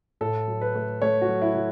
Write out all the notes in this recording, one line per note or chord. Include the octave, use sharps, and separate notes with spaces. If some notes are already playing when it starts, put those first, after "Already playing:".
A2 A4
F#3
B4
A3
A3 C#5
F#4
F#3
E4
F#3